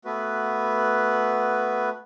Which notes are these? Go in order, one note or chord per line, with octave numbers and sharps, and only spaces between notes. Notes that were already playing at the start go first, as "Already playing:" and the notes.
A3 B3 F#4 B4